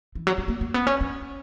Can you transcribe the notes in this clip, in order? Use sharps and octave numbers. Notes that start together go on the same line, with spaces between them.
E3
F#3
G3
A#3
A#3
B3
C#4
C#4